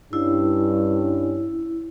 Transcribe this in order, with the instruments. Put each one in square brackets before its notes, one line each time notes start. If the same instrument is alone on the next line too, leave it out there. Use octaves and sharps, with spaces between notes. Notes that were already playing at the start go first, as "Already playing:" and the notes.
[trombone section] G2 C#4 [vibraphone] E4